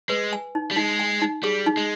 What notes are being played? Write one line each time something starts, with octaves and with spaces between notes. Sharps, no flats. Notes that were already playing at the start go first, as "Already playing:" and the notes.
G#3 B4
G#5
D#4
G3
G#3 D#4
G#5
D#4
G3 G#4
D#4
G#3